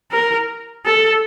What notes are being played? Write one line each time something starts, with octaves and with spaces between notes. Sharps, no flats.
A#4
A4